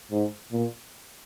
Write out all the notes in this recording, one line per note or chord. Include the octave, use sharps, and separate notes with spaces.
G#2
A#2